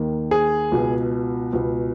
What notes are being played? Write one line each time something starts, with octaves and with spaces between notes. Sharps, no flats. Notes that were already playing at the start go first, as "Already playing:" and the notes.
Already playing: D#2 D#3
G#4
C#2 B2
C#2 B2